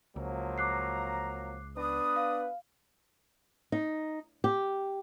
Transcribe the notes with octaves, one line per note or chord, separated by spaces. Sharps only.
C#2 F3 F#3 A#3
A#5 D6 F#6 C7
B3 D4 B4 D#6
F5
D#4
G4